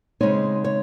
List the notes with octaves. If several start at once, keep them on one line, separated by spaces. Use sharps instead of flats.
C#3 G#3 C4 D#4 C#5
C#5